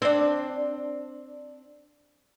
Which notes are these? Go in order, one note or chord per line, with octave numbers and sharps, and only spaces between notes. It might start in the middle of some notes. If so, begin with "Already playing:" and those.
C4 D4